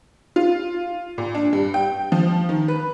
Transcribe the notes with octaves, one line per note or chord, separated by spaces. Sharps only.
F4
A#2
D4
G2
G5
F3
D#3
B4